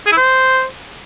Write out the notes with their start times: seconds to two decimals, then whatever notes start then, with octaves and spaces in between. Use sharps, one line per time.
0.06 G#4
0.12 E4
0.17 C5